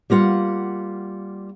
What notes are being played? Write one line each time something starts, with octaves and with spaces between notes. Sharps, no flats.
G3 A#3 F4 F#5